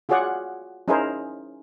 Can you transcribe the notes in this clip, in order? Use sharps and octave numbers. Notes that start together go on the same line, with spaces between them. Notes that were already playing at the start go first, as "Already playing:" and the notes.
F4 F#4 G#4 C#5 D5 F#5
C#4 D#4 E4 G#4 A#4 C5